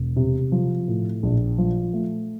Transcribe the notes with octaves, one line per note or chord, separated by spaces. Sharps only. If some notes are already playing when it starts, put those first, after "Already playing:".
Already playing: E1
C3
F3
A2
A#1
F3
A3